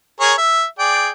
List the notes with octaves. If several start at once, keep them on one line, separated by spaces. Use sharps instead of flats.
G#4 A#4 C#5
E5
G#4 D5 G5